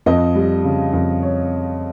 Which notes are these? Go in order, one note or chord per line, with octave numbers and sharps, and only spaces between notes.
F2 D#5
G3
C#3
F2
C#5